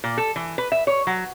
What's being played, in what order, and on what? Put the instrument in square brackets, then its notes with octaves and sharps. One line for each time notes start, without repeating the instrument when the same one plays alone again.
[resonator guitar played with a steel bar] A#2
A4
E3
B4
E5
C#5
F#3